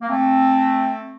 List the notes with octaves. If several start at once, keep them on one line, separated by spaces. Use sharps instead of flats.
A#3
A3 C4